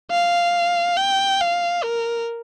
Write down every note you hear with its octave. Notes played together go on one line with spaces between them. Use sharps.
F5
G5
F5
A#4